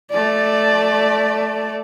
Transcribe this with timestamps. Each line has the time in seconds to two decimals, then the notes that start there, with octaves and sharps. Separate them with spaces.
0.11 A3 D5